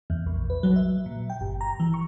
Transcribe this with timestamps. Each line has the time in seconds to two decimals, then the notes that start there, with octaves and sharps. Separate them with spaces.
0.10 E2
0.26 A#1
0.50 B4
0.63 F#3
0.76 E5
1.06 A#2
1.30 G5
1.41 G1
1.61 A#5
1.80 E3
1.94 C#6